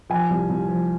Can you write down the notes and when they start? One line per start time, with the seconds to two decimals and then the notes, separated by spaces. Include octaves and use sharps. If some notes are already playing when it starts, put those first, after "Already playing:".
0.10 F3 G#5
0.30 C2
0.49 C2
0.69 F3